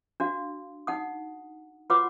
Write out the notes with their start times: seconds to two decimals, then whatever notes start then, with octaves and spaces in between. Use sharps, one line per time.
0.20 D4 F#4 F5
0.87 D#4 F#5 D#6
1.90 F4 F#4 B4 C#5 F#5 D6